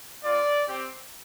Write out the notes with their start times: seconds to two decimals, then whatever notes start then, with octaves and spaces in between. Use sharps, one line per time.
0.23 C4 F4 D5
0.68 C4 G4